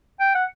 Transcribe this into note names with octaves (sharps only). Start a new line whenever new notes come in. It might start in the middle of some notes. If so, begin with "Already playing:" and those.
G5
F#5